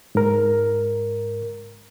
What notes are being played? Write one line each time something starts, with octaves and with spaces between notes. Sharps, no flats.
G#2 A#4